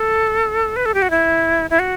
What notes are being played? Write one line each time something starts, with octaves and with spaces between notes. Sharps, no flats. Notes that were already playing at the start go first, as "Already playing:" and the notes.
Already playing: A4
B4
A4
G4
F#4
E4
E4
F#4